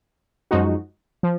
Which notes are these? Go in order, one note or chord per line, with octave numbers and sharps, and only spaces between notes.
F#2 F3 G#3 D#4 F#4
F3